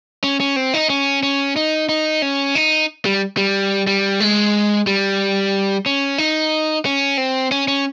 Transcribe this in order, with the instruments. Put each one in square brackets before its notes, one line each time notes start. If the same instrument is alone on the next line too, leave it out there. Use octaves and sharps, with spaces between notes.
[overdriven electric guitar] C#4
C#4
C4
D#4
C#4
C#4
D#4
D#4
C#4
D#4
G3
G3
G3
G#3
G3
C#4
D#4
C#4
C4
C#4
C#4